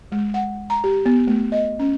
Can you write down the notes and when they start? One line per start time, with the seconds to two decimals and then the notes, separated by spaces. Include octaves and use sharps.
0.12 G#3
0.34 F#5
0.70 A#5
0.84 G4
1.06 B3
1.28 A3
1.52 D#5
1.79 C#4